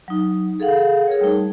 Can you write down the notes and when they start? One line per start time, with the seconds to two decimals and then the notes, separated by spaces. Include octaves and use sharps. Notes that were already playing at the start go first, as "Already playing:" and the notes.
0.08 F#3 D#4
0.60 G#4 A4 F5 F#5
1.08 G#4 A#4 C#5
1.21 G3 A3 D#4